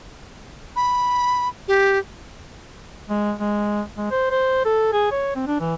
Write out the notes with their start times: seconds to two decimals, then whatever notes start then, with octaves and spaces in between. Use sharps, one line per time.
0.76 B5
1.68 G4
3.10 G#3
3.40 G#3
3.97 G#3
4.11 C5
4.31 C5
4.66 A4
4.93 G#4
5.11 C#5
5.36 C4
5.47 D4
5.60 E3